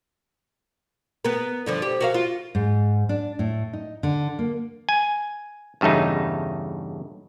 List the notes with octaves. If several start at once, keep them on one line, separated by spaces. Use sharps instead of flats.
B3 A#4
G2 D3 F3
G4
F#4 A#4 F5
F4
G#2
D4
A2
D#4
D3
A#3
G#5
E2 G2 C#3 A3 D#4